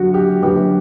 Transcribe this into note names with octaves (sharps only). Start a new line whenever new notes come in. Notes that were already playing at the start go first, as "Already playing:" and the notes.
Already playing: F#2 D3 F#4
G4
F#2 D3 G4 B4